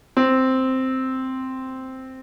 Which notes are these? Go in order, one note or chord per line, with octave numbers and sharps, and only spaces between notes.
C4